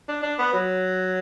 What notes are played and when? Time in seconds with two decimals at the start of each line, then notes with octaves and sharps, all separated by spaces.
0.08 D4
0.23 D4
0.39 B3
0.53 F#3